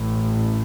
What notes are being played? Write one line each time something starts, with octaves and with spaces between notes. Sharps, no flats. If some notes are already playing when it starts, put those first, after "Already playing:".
Already playing: A1 A2